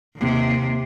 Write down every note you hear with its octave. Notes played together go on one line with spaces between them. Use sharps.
D#2 C3